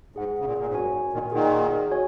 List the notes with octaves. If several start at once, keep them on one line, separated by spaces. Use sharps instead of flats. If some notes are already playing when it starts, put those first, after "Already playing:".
G#2 G#4 F#5
C#3
A#2
A#2
G#2
F#2 F#4 A#4 C#5 G#5
G#2
A#2 D#3
A#2 D#3 G#4 F#5
F#4 C#5 G#5